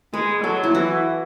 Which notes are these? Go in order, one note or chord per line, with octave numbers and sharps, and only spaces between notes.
G#3 B4
F#3 A4
E4
E3 F#4